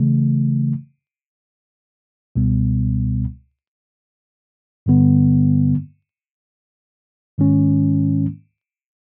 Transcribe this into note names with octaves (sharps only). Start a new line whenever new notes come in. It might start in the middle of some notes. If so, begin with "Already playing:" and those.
Already playing: C#3 E3 A3
C#2 B2 G3 B3
G2 D3 G3 B3
G#2 D#3 G#3 C#4